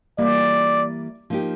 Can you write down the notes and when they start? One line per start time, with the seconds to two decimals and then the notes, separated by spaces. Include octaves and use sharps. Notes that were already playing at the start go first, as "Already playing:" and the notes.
0.18 E3 G3 A#3 D5
1.30 F3 A#3 D#4 G4